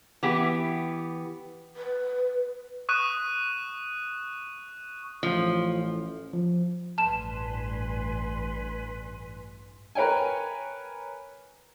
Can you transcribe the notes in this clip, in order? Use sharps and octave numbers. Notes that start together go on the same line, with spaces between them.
E3 B3 G4
B4
C#6 D#6 F#6 D#7
A1 F3
F3
A1 G2 B4 G#5 A5 C6 E7
A#4 B4 C#5 G5 G#5